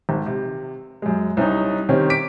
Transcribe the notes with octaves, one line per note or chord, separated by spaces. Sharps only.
G#1
C3
F#2 G#3
C2 C#4 D#4
C3 D#3 C4 C#4
D6 B6 D7